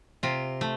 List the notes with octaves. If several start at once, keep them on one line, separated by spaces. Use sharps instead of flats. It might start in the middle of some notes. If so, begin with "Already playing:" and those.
C3 F4
A3